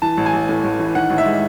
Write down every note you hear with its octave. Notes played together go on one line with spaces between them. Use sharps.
E3 A5
A1
G#5
A1
A2
A1
E3
D#3 F#5
A1
E5
G#3